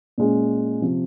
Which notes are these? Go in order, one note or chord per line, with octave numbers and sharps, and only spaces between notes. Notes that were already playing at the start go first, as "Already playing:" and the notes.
A#2 G#3 C#4
C3 F3